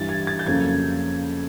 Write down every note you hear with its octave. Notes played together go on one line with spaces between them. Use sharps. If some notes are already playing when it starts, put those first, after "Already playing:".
Already playing: G2 E3 G3 A6
G#6
A6
G6
F2 C#3 F#3 A#3 C#4 G#6